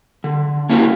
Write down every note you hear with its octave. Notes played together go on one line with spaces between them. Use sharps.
D3
A#3 C#4 E4 F#4 G4 A#4